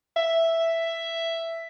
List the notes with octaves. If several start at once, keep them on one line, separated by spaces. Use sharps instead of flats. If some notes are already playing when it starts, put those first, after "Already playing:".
E5